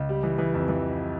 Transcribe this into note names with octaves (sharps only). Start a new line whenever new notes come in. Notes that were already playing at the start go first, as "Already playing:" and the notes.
Already playing: C#2
G3
E3
E3
F2
E3